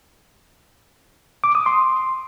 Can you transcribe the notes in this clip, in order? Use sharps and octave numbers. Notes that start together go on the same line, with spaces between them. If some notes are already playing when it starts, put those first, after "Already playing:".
D6
D#6
C6